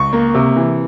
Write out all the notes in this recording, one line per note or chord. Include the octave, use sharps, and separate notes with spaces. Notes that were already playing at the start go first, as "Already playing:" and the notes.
Already playing: C#2 C#6
A#3
C3
E3